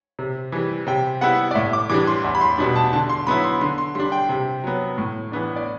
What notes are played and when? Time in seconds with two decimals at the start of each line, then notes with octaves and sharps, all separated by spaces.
0.19 C3
0.52 E3 G3
0.87 C3 G5
1.21 G3 B3 E4 F#5
1.51 D5
1.55 A2 E5
1.73 D6
1.89 E3 G3 D4 D6
2.07 C6
2.24 E2
2.35 B5
2.41 C6
2.58 B2 G3 D4
2.76 A5
2.93 D3 A5
3.10 C6
3.26 F#3 B3 E4 B5
3.44 C6
3.61 D3 C6
3.78 C6
3.95 G3 D4 C6
4.12 G5
4.29 C3
4.64 F#3 B3
4.98 A2
5.32 E3 B3 D4
5.56 D5